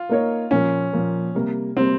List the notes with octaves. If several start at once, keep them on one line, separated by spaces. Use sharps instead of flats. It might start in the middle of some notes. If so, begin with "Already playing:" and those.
Already playing: F4
A#3 D#4 A#4 C#5
A#2 F3 A#3 C#4
A#2 F3 A#3
C3 G3 A#3
C3 G3 A#3 C4